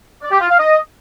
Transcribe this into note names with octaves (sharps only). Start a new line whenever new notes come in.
D5
G4
F4
F5
D#5